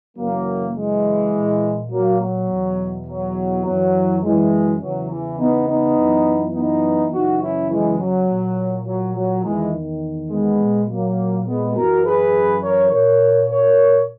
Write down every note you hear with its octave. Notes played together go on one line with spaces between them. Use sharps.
F#2 C#3 E3 F#3 A#3
E3 G#3
A#2
F#3 A#3
F#3
E2 B2
F#3
F#2 E3 F#3
E3 G#3
E2 C#3 E3 F#3
E3
B3 D#4
B3 D#4
F#2 E3
B3 D#4
F#2 C#3 E3 D#4 F#4
C#4 E4
E3 G#3
F#3
A#2
F#3
F#3
E2 D#3 E3 G#3
G#3 B3
A#2
F#3 A#3
G#3 B3
F#2 E3 F#4 A#4
G#4 B4
A#4 C#5
A#2 A#4 C#5
A#4 C#5